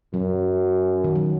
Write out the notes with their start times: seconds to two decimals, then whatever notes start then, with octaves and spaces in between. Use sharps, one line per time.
0.14 F#2 F#3
1.04 D#3
1.16 F#3